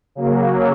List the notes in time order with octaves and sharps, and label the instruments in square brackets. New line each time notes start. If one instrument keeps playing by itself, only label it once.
[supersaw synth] C#3 F#3 A#3